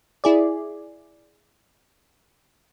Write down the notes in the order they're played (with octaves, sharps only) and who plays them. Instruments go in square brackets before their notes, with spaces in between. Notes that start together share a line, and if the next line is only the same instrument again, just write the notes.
[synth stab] E4 G#4 D5